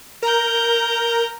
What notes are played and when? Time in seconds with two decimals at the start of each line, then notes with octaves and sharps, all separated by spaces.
0.23 A#4 A#5 G6